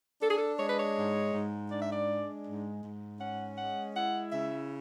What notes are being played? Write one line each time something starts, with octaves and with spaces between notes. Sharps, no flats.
D4 A4
G#4
A4
G#3 C#5
B4
C#5
G#2
G#2
D4 D5
E5
D5
G#3
G#2
G#2
C#4 F#5
G#3 F#5
E4 F#5
C#3 E5